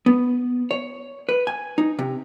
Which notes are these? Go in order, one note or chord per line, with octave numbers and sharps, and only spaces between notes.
B3
C#5
B4
G#5
D#4
C3